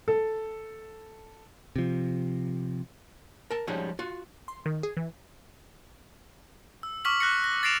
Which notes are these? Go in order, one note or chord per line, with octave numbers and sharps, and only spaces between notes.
A4
C3 F3
A#4 A5
F3 G3 G#3 C#4 D#4 F#4
F4 F#4
C6
D#3
G#4
E3
E6
C#6 D6 F6 B6 F#7
D6 F#6 A#6 C#7
A#6
A6 A#6 C7 D7 E7 F7